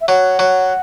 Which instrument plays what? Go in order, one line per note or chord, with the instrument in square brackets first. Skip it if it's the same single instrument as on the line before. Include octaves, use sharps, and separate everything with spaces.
[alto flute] E5
[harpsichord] F#3 [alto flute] F#5
[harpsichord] F#3